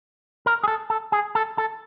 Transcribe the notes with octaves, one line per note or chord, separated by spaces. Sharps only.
A#4
G#4
A4
A4
G#4
A4
A4